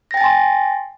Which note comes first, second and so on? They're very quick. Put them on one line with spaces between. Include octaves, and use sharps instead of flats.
A#6 G5 A6 G#5 C6